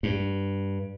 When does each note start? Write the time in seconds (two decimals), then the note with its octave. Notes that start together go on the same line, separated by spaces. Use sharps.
0.03 G2